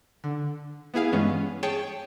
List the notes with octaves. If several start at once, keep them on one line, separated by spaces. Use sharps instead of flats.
D3
B3 E4 G#4 F5
G2 E3 G#3 B3 C#4
G#4 C#5 G5 A5